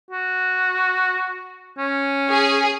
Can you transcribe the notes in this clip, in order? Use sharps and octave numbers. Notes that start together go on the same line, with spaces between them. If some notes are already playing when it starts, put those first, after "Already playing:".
F#4
C#4
G#4